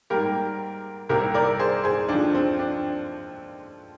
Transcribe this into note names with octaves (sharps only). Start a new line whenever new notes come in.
G#2 G3 A#3 G4 A#4
C2 C3 G3 A#3 G4 A#4
A#4 D5
G#4 C5
G#4 C5
D#2 D3 F3 D4
C4
D4